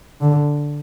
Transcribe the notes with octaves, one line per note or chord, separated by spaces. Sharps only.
D3